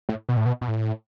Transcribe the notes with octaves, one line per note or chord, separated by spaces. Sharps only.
A2
B2
A2
B2
B2
A2